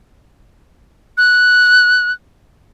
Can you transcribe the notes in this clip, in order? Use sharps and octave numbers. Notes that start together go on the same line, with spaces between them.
F#6